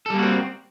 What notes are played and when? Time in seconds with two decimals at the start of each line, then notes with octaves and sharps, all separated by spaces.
0.06 A4
0.10 G3
0.14 A#3
0.18 F#4
0.23 C4